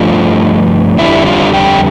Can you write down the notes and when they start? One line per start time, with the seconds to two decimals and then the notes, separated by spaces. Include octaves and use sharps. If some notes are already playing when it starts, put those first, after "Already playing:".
Already playing: G2 F3 A3 D4 F4
0.98 F2 D3 G3 E4
1.26 F4
1.53 G4